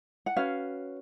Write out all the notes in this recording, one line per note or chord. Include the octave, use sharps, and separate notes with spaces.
F#5
C#4 F#4 B4 F5